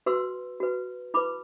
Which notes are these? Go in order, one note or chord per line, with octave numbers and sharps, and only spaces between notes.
F#4 B4 C6 E6
F#4 B4
E4 B4 B5 D6